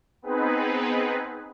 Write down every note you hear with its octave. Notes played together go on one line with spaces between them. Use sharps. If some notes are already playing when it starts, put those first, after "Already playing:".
B3 C4 D#4 G#4 B4